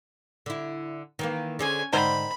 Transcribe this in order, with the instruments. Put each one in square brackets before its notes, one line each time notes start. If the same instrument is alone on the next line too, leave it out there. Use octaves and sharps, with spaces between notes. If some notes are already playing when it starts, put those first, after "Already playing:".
[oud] D3 E4
D#3 E3 A#3
[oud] D3 G#4 C5 [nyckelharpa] C#4 G#5
[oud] G#2 D3 [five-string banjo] D#3 A#4 C5 [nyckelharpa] B5